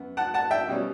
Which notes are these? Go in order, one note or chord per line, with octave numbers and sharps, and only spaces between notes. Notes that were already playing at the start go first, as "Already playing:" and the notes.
Already playing: F#2 B3
F#5 A5
F#5 A5
E5 G5
B2 G3 C#4